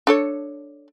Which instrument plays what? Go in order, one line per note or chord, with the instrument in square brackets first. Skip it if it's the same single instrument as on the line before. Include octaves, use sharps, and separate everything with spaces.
[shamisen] D4 A4 C#5